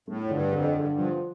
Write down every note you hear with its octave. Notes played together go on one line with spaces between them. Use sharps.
A2 A3
F2
G2 D3
F2 D3
G2 D3
G2
F3